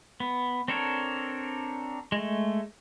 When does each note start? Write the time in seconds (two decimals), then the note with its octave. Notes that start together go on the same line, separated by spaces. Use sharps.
0.20 B3
0.68 C4 D4 A4 A#4 C#5
2.12 G#3 A3